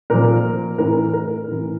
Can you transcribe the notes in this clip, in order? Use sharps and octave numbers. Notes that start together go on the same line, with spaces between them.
A#2 F3 A#4
A2 E3 A#4
A#4
A2 E3